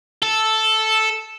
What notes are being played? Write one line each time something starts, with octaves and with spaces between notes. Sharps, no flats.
A4